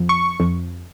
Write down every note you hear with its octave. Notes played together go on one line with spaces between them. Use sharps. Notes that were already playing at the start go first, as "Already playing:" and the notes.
Already playing: F2
C#6
F2